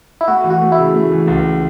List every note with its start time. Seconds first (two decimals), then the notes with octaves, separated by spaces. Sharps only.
0.21 E4
0.28 A3 F#4
0.44 E3
0.50 F#4
0.62 A3
0.72 E4
0.78 C#3
0.95 A3
1.12 E3
1.27 C#2